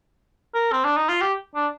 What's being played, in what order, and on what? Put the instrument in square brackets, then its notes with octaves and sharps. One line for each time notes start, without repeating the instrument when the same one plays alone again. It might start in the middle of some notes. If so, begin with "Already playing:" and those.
[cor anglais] A#4
C4
D4
D#4
F4
G4
D4